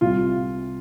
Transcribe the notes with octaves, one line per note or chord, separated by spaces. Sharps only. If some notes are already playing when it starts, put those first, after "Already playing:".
C2 C3 G3 F4